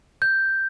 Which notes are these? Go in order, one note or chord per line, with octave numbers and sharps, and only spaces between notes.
G6